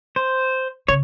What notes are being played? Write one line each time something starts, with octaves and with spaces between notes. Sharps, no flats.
C5
C#3 C#5